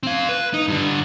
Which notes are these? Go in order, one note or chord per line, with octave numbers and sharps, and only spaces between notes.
C4 F5
B4
D#4
G2 D3